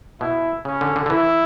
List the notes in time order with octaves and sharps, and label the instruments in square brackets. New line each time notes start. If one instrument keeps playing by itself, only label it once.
[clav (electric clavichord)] B2 [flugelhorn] E4
[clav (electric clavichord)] C#3 [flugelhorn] C#4
[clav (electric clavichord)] D3
D3
D3
[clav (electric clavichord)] E3 [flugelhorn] E4